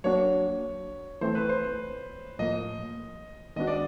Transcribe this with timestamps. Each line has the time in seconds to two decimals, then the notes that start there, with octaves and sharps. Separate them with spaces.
0.04 F#3 A#3 D4 F#4 C#5
1.21 E3 A3 C4 C5
1.35 B4
1.49 C5
2.39 A2 F3 A#3 D#5
3.56 D#3 G#3 B3 D4 F#4 D#5
3.67 D5